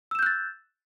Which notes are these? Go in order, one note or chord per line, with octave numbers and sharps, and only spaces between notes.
E6 F#6 G6 A6 E7